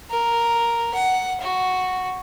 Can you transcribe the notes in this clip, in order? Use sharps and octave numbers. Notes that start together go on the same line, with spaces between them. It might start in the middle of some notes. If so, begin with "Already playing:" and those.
A#4
F#5
F#4